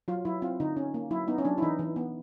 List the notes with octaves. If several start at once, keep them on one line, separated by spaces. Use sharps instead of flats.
F#3 F4
F#3 E4
C4 F4
D3 D#4
C#4
A#3
F#3 E4
B3 D#4
C#4
F#3 D4
E4
E3 D#4
E3
B3